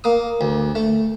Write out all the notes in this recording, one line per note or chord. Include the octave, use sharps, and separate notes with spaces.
A#3 D#6
D2
A3